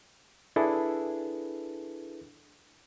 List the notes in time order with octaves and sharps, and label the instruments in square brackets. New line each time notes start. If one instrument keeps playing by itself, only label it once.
[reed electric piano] D4 E4 G#4 A4 B4